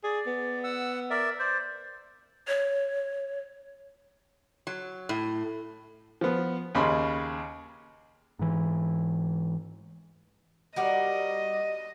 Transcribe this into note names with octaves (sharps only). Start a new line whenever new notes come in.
G#4 D5
B3
F#5 E6
A#4 D5 E5
C5 D5
C#5
F#3
A2
F3 B3
D#2 C#3 B5 C6
G#2 E3
G3 F#4 A#4 D#5